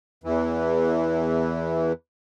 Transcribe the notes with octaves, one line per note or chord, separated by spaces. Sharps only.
E2 E3